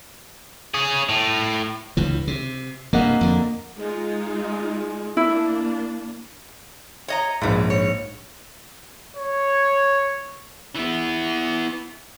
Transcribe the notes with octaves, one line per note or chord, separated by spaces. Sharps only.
C#4 G#4
A2
C#2 G2 E3
C3
G2 C3 A#3 D#5 F#5
F2 D3
G#3 D#4 F4
A#3 D4 E4
C#5 D#5 A#5
A#1 E2 G#2 F#3
C#5
C#5
E3 B3